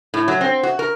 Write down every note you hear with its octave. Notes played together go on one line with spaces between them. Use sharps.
A2
F#3
C4
F#4
A#4